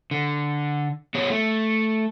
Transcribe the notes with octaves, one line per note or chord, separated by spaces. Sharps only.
D3
B3 G#4 C#5
A3